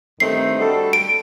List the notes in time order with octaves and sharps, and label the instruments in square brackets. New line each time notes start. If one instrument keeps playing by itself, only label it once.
[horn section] G2 D#3 A3 C4 D#4 [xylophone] C7
[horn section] G3 D4 F#4 A4
[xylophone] D7